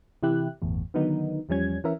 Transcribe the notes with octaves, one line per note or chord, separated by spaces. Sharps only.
C3 E3 E4 G4 F#6
G1 E2 A2
D3 D#3 F#3 B3 D#4
E2 F3 G3 C#4 G#6
E3 C#4 A#4 E5